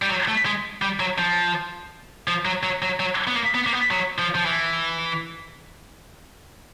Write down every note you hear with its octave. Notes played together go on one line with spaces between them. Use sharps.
G3
F#3
A3
G#3
G3
F#3
F3
F3
F#3
F#3
F#3
F#3
B3
A#3
B3
A#3
B3
F#3
F3
F3
E3